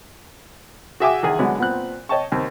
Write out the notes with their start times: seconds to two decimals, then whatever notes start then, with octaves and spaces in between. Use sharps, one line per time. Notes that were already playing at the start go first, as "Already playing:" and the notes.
1.00 F#4 G#4 E5 G5 G#5 D6
1.23 E2 D#3 G#4 F#5 G#5
1.39 D3 F#3 G#3 B3
1.59 A#2 B3 C4 F#6
2.09 C#5 D#5 G5 A5 C#6
2.32 D#2 C4